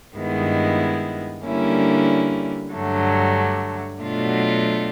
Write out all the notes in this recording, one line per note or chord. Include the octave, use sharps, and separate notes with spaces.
G2 D#3 G#3 B3 E4
D3 G3 A#3 C#4 E4
G2 D3 F#3 A3
B2 F#3 A3 D4 F4